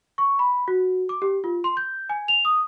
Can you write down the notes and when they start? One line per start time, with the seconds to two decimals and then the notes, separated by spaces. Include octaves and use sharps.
0.18 C#6
0.39 B5
0.68 F#4
1.09 D6
1.22 G4
1.44 F4
1.64 C6
1.77 G6
2.10 G#5
2.28 F7
2.45 D#6